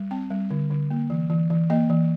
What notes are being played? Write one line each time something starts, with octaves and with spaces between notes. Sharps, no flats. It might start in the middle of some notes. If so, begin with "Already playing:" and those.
Already playing: G3
C4 G5
G3
D3
D3
A#3
E3
E3
E3
A#3 D#5
E3